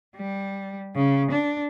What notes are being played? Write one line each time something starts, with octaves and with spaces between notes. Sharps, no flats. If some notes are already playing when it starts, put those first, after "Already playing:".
G3
C#3
D4